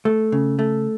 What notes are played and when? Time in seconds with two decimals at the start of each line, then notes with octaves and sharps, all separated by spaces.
0.05 A3
0.32 C#3
0.59 A3